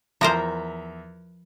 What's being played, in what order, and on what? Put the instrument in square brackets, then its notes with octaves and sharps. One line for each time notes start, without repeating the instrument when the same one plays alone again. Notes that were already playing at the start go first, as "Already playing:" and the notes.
[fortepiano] E2 E5 A#5 [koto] F3 A#4 C5